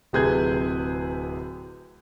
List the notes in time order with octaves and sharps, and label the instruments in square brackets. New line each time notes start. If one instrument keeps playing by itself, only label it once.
[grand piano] D1 C3 G#4 B4 G6 G#6